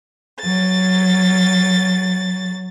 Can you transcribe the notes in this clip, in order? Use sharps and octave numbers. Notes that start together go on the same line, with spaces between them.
F#3 A6